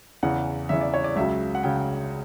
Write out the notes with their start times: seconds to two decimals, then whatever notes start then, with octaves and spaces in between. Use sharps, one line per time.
0.23 E2 C#3 E3 F#5
0.69 E2 C#3 E3 E5
0.81 D5
0.94 C#5
1.04 D5
1.16 C#2 C#3 F#3 E5
1.55 F#5
1.63 C#3 F#3 G5